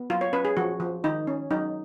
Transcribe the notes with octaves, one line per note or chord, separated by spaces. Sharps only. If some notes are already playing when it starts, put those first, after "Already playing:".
Already playing: B3
F#3 F4
C#5
C#4 B4
G#4
F3 F#4
F3
D#3 D#4
C#4
F#3 D#4